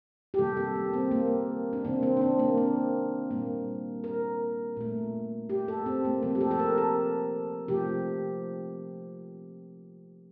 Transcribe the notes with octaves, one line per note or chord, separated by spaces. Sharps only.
G4
C3 D#3 G3 A#3 A4
A4
A#3
C4
A#3
D4
C3 D#3 A#3 C4
C4
D4
C4
A#3
C4
A#2 G3 A#3
A#4
A#2 A3
G4
A4
C4
A#3
C3 F3 A3 C4
G4
A4
A4
A#4
A4
C3 F3 A3 G4